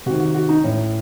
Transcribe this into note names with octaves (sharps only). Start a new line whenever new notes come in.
C3 D#3 F#4
F#4
F#4
D#4
A2 E3 C#4